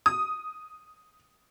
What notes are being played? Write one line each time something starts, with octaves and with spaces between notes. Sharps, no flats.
D#6